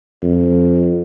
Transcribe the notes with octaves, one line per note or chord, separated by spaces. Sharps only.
F2